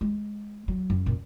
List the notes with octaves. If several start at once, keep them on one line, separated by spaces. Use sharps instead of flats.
G#3
F#3
F#2
A#2